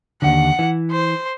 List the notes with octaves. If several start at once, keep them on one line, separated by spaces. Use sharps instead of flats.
D#2 D3 F#5
E3
C5